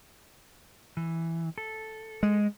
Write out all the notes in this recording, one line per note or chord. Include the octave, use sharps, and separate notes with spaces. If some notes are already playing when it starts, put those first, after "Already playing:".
E3
A4
G#3